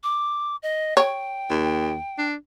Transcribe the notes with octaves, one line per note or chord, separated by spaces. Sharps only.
D6
D#5
C#5 G5
D#2
D4